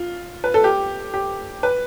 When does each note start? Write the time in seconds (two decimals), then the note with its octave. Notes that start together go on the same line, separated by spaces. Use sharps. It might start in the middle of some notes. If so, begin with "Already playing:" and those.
Already playing: F4
0.44 B4
0.54 A4
0.64 G4
1.14 G4
1.63 B4